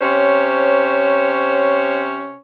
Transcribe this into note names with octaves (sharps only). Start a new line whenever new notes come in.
C3 C#4 C5 C#5